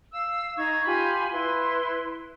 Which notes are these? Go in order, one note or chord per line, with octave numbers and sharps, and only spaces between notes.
F5 E6
D#4 A#5 C#6 G#6
F4 G4 G#5 B5
E4 B4 C6